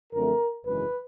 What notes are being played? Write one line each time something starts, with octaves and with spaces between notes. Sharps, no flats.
F#2 D3 F3 A3 C4 A#4
G#1 F#2 C#3 E3 G#3 B4